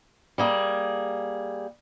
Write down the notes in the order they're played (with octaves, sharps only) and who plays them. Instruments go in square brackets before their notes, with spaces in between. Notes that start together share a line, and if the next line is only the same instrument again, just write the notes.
[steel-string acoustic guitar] G3 A#3 G#4